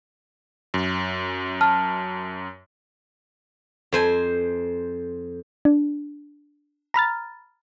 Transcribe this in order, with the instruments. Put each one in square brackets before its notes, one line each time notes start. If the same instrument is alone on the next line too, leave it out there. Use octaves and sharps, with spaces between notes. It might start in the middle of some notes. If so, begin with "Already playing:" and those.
[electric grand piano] F#2
[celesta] A5 F6
[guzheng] F2 C5 G#5
[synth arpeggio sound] D4
A#5 B5 F6 A6